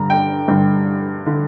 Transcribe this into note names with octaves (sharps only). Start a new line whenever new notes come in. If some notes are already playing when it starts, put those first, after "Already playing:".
Already playing: G2 D3 A#5
G5
G2 D3
D3